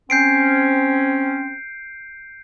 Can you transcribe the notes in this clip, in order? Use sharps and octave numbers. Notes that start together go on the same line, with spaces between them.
C4 C#4 G6 C7 D7